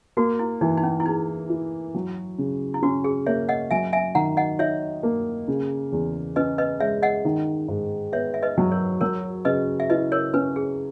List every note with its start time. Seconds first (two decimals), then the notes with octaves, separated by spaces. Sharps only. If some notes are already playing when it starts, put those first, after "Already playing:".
0.17 A#3 F#4
0.39 E4
0.61 E3 D#4
0.78 D#4
0.83 C#4
1.00 E4
1.06 D#4 G#4
1.49 E4
1.95 F#3
2.38 C#3
2.74 E4
2.82 C#4 F#4
3.04 G#4
3.26 A#3 C#5 E5
3.49 D#5 F#5
3.71 F#3 E5 G#5
3.93 E5 G#5
4.15 D#3 F#5 A#5
4.37 D#5 F#5
4.59 D#4 C#5 E5
5.03 A#3
5.48 C#3
5.92 E2
6.36 C#4 B4 D#5
6.58 B4 D#5
6.80 G#3 C#5 E5
7.03 D#5 F#5
7.25 D#3
7.68 G#2
8.12 B3 C#5 E5
8.34 E5
8.43 B4 D#5
8.58 F#3
8.72 A#4 C#5
9.01 F#3 A#4 C#5
9.45 C#3 B4 D#5
9.80 E5
9.90 E4 B4 D#5
10.12 A#4 C#5
10.34 C#4 B4
10.56 G#4